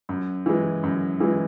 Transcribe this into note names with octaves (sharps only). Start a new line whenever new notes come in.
F#2
E3 G#3
F#2
E3 G#3